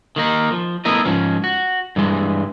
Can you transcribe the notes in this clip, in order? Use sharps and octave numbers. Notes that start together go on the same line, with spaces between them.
D#3 A#3 D#4
F3
A3 B3 E4 A#4 D#5
G#2 F3 C#4
F#4
G2 E3 G#3